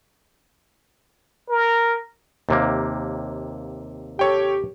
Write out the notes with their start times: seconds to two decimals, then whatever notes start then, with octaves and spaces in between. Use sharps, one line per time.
1.49 A#4
2.49 D#2 C3 A#3
4.19 G4 A4 C#5 G5